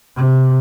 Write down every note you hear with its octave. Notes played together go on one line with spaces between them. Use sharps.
C3